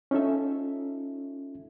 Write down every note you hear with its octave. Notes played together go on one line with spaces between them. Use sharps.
C#4 D#4 F4 A4 E5